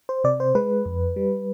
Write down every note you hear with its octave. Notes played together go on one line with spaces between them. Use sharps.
C5
C3 D5
C5
G#3 B4
F2
G3